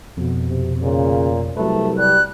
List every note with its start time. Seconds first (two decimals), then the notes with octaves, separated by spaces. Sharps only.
0.17 F2 B2
0.49 C3
0.82 A#2 C#3
1.57 C2 F#3 A3 B4
1.99 G3 F#6